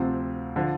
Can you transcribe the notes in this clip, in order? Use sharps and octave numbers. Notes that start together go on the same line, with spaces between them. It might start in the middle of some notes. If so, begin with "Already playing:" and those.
Already playing: D2 C3 F3 C4
D3 F3